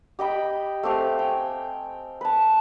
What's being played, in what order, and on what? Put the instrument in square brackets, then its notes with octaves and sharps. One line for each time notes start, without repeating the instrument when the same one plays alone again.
[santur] G4 D#5 G5 B5
A3 C4 G4 F5
G5 G#5
B4 A5